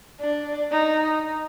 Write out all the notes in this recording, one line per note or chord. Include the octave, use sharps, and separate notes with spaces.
D4
D#4